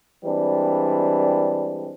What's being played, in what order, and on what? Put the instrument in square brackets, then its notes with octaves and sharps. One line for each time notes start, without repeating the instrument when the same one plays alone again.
[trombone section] E3 G3 G#3 C4 D4